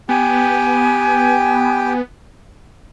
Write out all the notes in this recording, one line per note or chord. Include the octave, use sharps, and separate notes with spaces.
B3 G4 G5 G#5